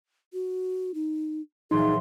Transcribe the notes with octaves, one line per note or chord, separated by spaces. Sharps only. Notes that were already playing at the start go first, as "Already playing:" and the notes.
F#4
D#4
A#2 E3 F#3 D#4 G#4 C6